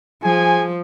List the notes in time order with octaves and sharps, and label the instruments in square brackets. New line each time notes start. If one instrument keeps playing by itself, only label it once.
[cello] F3 [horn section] G#4 G#5